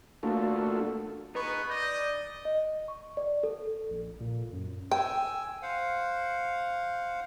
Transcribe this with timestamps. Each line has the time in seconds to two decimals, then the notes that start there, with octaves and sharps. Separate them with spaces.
0.23 A3 A#3 D4 F4 F#4 A4
1.35 B3 D#4 G#4 B4 C#6
1.70 D5 D#5 G6
2.45 D#5
2.88 C#6
3.17 D5
3.43 A4
3.90 A#1
4.20 A#2
4.53 F#2
4.91 G5 G#5 E6
5.62 C5 F5 F#5